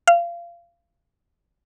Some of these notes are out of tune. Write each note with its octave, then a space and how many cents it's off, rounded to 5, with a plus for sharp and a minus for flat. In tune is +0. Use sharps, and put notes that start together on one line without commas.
F5 -25